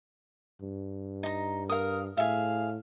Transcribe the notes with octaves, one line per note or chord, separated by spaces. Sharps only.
G2
D#4 A#5
A#4 F5 D#6
A2 G#4 E5 F5